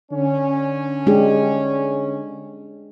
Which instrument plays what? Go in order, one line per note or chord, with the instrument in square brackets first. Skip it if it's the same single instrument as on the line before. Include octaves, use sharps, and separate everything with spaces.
[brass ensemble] D3 C#4
[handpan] G#3 D4 G4